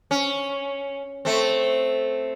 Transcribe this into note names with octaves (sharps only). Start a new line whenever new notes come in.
C#4
A3 C4